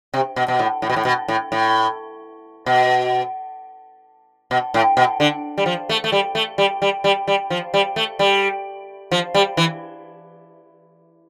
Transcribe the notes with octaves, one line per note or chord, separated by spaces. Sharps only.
C3
B2
B2
A2
A2
B2
A2
B2
A2
A2
B2
B2
A2
B2
D3
G3
F3
A3
A3
G3
A3
G3
G3
G3
G3
F3
G3
A3
G3
F3
G3
E3